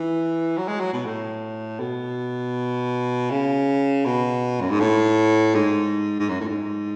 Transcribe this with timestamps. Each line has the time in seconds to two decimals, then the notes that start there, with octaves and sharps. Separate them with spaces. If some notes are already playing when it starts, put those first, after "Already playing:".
Already playing: E3
0.58 F#3
0.68 G#3
0.80 F#3
0.93 B2
1.06 A2
1.80 B2
3.31 C#3
4.06 B2
4.61 F#2
4.70 G#2
4.80 A2
5.55 G#2
6.19 G#2
6.29 F#2
6.41 A2
6.48 G#2